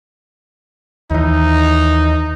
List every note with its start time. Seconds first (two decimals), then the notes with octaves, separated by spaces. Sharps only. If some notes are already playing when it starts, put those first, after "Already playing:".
1.11 D#2 E3 D#4